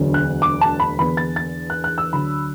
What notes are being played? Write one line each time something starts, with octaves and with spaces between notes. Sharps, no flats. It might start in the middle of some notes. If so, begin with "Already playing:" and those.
Already playing: E1 D2 D3 F#3
F#6
D6
A5
B5
E2 D3 B3 B5
A6
A6
F#6
F#6
E6
D2 D3 F#3 B5